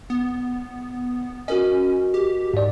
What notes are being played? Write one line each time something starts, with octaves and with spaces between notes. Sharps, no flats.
B3
C#4 F#4 A#4 D#5
G4
G#2 D5